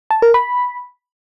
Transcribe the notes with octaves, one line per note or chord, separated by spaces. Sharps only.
A5
A#4
B5